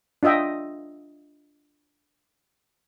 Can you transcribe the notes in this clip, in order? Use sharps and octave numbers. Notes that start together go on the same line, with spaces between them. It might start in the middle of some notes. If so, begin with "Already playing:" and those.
D4 F4 D#5 E5 G5